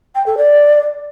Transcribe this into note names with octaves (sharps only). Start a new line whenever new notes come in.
G5
A4
D5